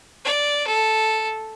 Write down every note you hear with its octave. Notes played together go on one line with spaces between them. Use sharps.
D5
A4